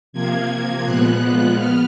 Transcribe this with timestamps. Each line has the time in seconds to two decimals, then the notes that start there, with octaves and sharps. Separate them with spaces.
0.13 C3 F3 A#3 G#6
0.84 A#2 F3 G#3 B3 F#6
1.56 B3 F6